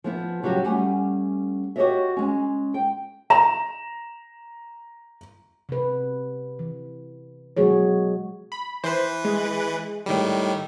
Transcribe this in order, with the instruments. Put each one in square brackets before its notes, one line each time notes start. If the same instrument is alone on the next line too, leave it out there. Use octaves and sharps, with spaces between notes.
[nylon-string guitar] F3 B3 E4
C#3 F#3 G3 F#4 G4
G3 A3 C#4 F#5 G#5
F#4 G4 A4 C#5 D#5 E5
G#3 C#4
G5
[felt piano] A#5 E7
[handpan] C3 B4
E3
B2 F#3 G#3 F#4 G#4 C#5
[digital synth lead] B5
[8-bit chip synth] E3 B4 [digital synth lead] C5
[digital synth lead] G#3
[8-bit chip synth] A2 D#3 G3